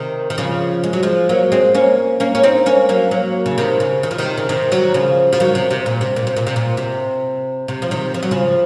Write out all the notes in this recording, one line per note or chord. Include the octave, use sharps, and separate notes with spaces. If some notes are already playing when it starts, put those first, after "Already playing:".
Already playing: C3 D#3
D#3
C#3 F3
G#3
F#3
F3 G#3
F#3 A#3
G#3 C4
A#3 C#4
A#3 C#4
C#4
C4 D#4
A#3 C#4
F#3 A#3
F#3 A#3
C#3
C3 D#3
C#3
D#3
F3
C3 D#3
C#3
C3 D#3
D#3 F#3
C#3 F3
F3
D#3 F#3
C3
C3
A#2
C3
A#2
C3
A#2
C3
A#2
C3
C3
F3
C3 D#3
F3
F#3
C#3 F3